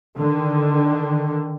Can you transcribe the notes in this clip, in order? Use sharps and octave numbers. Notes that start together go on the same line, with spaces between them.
D3 D#3